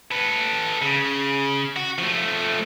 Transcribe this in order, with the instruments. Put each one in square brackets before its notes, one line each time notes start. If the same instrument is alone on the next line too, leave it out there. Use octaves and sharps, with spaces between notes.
[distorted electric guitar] A4 B4
C#3
F#4
F3 A3